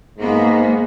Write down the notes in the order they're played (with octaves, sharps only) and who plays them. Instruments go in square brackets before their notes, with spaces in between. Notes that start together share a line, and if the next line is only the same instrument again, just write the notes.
[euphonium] G#2 [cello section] A#3 B3